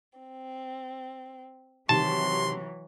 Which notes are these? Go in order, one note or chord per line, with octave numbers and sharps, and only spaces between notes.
C4
C3 D#3 E3 F#3 G3 A5 C6